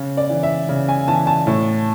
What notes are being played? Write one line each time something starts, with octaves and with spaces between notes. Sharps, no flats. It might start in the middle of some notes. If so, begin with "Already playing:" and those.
Already playing: C#3
D5
E3
E5
C#3
G#5
E3 A5
A5
A2